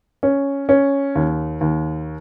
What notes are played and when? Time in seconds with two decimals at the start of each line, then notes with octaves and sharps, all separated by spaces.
0.23 C#4
0.69 C#4
1.15 D#2
1.61 D#2